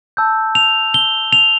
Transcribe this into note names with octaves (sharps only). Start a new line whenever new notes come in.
A5 E6 G6
F7
G7
F7